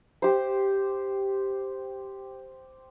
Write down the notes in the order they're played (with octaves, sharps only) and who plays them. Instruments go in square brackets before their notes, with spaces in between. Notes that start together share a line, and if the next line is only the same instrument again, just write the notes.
[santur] G4 C5